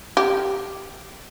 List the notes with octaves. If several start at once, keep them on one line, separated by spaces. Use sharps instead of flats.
G4